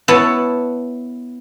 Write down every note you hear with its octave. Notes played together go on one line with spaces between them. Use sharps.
B3 E4 C#5 A5